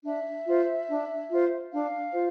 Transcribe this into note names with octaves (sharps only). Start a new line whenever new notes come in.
D4 E5
F4 C5
D4
F4 C5
D4 F5
F4 C5